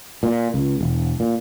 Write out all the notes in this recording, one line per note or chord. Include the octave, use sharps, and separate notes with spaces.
A#2
C#2
E1
A#2